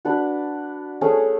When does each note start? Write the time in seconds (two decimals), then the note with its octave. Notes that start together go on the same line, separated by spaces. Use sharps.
0.05 D4 F#4 B4 D5
1.01 A3 C#4 G#4